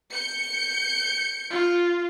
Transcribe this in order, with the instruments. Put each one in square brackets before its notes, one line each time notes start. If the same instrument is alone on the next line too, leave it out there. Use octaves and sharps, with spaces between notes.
[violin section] G6 C#7
[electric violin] F4